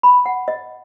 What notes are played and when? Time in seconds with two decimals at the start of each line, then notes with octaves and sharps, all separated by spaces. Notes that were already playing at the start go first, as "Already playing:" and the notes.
0.03 B5
0.26 F#5
0.48 D#5